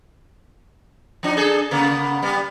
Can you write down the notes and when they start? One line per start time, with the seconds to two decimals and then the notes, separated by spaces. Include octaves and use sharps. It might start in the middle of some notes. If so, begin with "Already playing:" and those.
1.23 F3 D4 D#4
1.37 D4 G#4 A4
1.71 C#3 A#3 B3
2.22 G3 B3